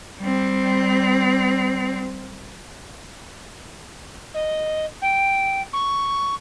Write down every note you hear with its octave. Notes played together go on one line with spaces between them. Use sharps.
G3 C4
D#5
G5
C#6